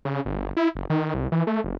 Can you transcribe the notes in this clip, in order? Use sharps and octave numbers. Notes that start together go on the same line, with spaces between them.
C#3
G1
E4
F#1
D#3
C2
E3
A3
F#1